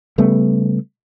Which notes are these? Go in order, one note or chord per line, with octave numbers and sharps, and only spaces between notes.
C#3 G3 A3 B3